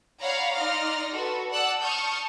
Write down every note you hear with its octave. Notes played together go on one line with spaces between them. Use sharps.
C#5 D5 F5 F#5 A#5 B5
D#4 D5 C6 F6 A#6
F#4 A4 B4
D5 F#5 A5 E6 F#6
A5 C#6 D#6 F6 G6